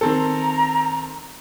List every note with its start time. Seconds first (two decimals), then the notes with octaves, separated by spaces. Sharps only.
0.01 D#3 C4 A4 A#5